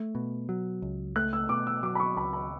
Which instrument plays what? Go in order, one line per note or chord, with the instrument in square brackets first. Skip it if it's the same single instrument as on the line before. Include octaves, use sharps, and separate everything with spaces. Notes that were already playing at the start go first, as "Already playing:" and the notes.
Already playing: [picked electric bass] A3
B2
F#3
C#2
[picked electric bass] A3 [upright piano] F#6
[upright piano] E6
[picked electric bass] B2 [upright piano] D6
[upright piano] E6
[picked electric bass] F#3 [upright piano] D6
[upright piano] B5
C#6
[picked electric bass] C#2 [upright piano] B5
[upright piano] B5